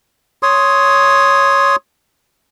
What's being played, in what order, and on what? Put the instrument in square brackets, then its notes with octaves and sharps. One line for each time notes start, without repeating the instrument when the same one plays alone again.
[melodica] C#5 C6 D#6